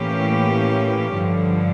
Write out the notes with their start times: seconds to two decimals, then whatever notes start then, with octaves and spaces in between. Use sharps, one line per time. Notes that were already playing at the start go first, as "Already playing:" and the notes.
Already playing: A2 E3 A#3 C#4 G4
1.18 G2 D3 F3